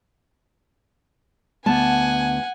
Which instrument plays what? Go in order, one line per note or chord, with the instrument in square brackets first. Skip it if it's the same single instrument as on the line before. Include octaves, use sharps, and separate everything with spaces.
[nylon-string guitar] D2 B3 A5 [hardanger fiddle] F#5 G#5